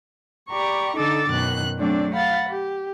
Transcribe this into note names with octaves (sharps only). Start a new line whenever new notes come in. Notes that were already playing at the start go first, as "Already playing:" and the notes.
G4 D5 A#5 B5 C#6
D3 D#4 A4 D6 E6 A6
F#2 B2 D#3 F#6
F#3 A3 C4 D4 D5
F5 F#5 B5 A6
G4